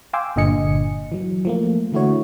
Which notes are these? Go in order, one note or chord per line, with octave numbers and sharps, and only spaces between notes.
F5 G5 G#5 C6 D6 E6
G1 A#2 D3 D#5 G#5 C#7
E3 F#3
F3 A3 A#3
D3 E3 A3 E4 F#4 C#5